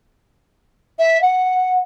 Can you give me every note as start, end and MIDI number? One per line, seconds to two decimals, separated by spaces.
0.99 1.20 76
1.22 1.77 78